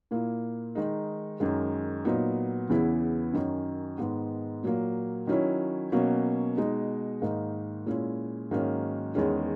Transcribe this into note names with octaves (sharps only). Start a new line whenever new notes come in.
A#2 A#3 E4
D#3 G#3 D#4
F#2 D#3 G#3
A#2 F#3 B3 D#4
E2 C#3 E3 B3 E4
F#2 D#3 F#3 C#4
G#2 D#3 G#3 B3
A#2 F#3 A#3
D#3 F#3 C#4 E4
B2 F#3 A#3 C#4
B2 G#3 D#4
G#2 D#3 A#3 D#4
A#2 G#3 C#4 E4
G#2 D#3 F#3 A#3 C#4
E2 D#3 G#3 C#4